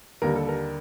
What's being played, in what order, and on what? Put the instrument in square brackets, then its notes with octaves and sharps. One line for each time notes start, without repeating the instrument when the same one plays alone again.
[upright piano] D#2 D3 G3 A#4
A4
A#4